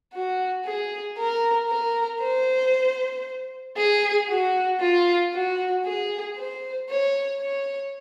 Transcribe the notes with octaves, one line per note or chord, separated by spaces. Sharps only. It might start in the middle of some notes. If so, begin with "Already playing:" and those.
F#4
G#4
A#4
A#4
C5
G#4
F#4
F4
F#4
G#4
C5
C#5
C#5